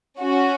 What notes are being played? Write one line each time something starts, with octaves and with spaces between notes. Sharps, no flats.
C#4 F#4